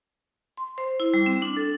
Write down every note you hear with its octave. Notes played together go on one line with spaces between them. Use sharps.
C6
C5
E4
G3
C4
D4
A4